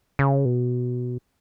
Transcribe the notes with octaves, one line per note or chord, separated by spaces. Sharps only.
C#3
B2